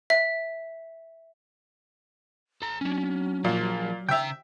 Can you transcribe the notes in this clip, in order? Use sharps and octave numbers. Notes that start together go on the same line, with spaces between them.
E5
A4 A#5
F#3 C#4 D4
A#2 F3 A#3
C#3 E5 G5 A#5